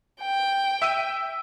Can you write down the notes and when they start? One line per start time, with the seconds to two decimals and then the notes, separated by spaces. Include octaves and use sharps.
0.22 G5
0.82 E5 E6 D#7